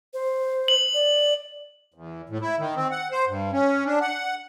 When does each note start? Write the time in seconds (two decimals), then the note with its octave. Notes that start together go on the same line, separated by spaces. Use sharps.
0.14 C5
0.68 F#7
0.94 D5
1.94 E2
2.30 A2
2.41 E4
2.58 D#3
2.76 C4
2.91 F#5
3.12 C5
3.27 G2
3.52 C#4
3.86 D4
4.01 F#5